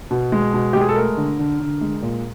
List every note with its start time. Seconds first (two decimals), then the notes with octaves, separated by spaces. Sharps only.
0.11 B2
0.32 G#3
0.53 B2
0.73 G#3 G4
0.81 G#4
0.89 A4
0.96 A3 A#4
1.17 D3
1.39 D3
1.60 D3
1.81 G#3
2.02 A#2